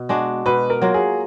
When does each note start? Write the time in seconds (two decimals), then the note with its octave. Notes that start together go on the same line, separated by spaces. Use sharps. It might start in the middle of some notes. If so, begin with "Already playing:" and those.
Already playing: B2
0.09 G#3 D4 F#4
0.46 B2 B4
0.70 A#4
0.82 F#3 A#3 F4
0.94 G#4